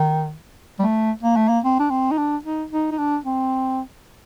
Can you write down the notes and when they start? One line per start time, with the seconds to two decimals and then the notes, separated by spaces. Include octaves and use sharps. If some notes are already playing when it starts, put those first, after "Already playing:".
Already playing: D#3
0.79 G3
0.83 A3
1.23 A#3
1.36 A3
1.49 A#3
1.65 C4
1.79 D4
1.90 C4
2.11 D#4
2.18 D4
2.45 D#4
2.71 D#4
2.92 D#4
2.98 D4
3.25 C4